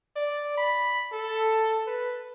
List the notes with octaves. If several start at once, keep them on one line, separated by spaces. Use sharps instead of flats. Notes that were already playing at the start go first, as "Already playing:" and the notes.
D5
B5
A4
B4